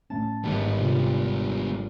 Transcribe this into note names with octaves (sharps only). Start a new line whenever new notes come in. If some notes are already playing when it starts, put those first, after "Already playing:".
A2 A3 C#4 A5
G#1 G#2 G3 B3
C3 D4 F4